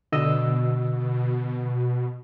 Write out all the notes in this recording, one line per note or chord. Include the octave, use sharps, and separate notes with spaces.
B2 D3 D#5 E6